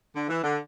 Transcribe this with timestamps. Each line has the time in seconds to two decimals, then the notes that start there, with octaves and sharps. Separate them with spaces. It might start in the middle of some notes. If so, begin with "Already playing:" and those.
0.14 D3
0.29 E3
0.43 D3